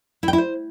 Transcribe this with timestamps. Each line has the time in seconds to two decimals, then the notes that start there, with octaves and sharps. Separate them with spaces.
0.23 E4
0.28 G5
0.33 E4
0.38 C5